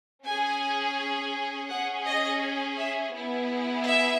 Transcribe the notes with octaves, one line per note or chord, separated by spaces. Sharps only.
C#4 G#4 G#5
C#4 G#4 F#5
D#5
E5
B3 E4 G#4
E5